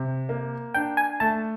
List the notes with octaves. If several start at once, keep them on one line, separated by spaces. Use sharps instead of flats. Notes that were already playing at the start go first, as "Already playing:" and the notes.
Already playing: C3
A#3
D4 G5
G#5
A3 A5